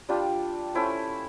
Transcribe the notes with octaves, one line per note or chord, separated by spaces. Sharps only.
G3 D4 F4 G4
A3 C#4 E4 C5